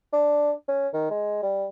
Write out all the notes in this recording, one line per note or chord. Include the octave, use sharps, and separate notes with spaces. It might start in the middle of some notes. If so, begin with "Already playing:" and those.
D4
C#4
D#3
G#3
G3